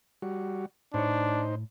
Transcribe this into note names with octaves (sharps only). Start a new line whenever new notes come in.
G3 F#4
A2 D4 D#4 C5 C#5